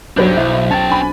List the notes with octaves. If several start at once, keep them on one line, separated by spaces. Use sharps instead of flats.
B1 F#3 D4 G4 B4 C5 G6 A6
B1 E4 G6
C#4 G5 A5 A6
D4 G#5 B5